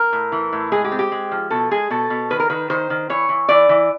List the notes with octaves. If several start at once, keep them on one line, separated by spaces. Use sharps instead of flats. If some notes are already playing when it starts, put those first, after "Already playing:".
Already playing: A#4
A2
E3
A2
G#3 G#4
G4
C4
G4
G#3
F3
B2 A4
G#3 G#4
B2 A4
B2
D#3 B4
A#4
D#3 B4
D#3 C5
D#3
E3 C#5
E3
E3 D5
E3